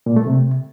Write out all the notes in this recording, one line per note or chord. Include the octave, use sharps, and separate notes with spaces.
A#2
A3
C3